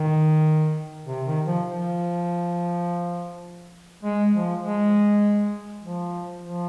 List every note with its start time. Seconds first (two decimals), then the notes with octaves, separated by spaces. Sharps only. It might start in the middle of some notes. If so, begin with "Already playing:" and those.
Already playing: D#3
1.07 C3
1.26 D#3
1.46 F3
1.66 F3
4.03 G#3
4.34 F3
4.63 G#3
5.83 F3
6.43 F3